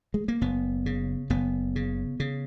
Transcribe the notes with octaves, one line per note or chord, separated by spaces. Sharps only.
G#3
A#3
F#1 B3
C#3
F#1 B3
C#3
C#3